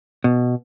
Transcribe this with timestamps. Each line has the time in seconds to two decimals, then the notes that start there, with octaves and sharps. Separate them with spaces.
0.24 B2